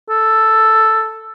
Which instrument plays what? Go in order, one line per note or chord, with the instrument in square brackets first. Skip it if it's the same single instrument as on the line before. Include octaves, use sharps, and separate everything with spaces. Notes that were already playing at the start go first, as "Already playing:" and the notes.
[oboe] A4